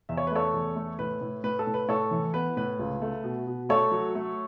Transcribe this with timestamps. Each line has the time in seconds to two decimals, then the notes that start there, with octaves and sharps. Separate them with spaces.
0.09 E2 E5
0.17 C#5
0.27 B4
0.32 A3 A4 C#5
0.54 E2
0.76 A3
0.99 A2 B4
1.21 A2
1.44 A2 B4
1.59 A4
1.67 A2
1.74 B4
1.89 A2 A4 C#5
2.11 E3
2.34 B3 B4
2.57 A2 B4
2.79 C#2
3.02 A3
3.24 B2
3.47 B2
3.69 A3 A4 C#5
3.91 F#3
4.15 A3